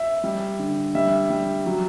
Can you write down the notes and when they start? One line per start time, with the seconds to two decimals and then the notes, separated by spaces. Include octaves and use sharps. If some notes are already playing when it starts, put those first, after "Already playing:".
Already playing: E5
0.24 G3
0.59 D3
0.95 G3 E5
1.30 G3
1.66 F#3